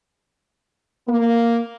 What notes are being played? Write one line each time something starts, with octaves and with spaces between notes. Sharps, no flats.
A#3